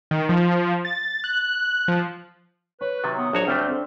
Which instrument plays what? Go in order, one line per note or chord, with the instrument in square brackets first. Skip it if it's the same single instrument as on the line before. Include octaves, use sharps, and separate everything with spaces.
[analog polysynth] D#3
F3
A6
F#6
F3
[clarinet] B4 [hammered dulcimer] C#5 [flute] F#6
[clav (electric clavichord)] C3 D#3 F#3 [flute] A6
[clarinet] B3 [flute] D#6
[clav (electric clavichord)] A#1 F#4 C#5 [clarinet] F#3 [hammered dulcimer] D4
[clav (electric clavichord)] D2 G3 A3 [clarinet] C4 [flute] F6
[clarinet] C4 [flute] C5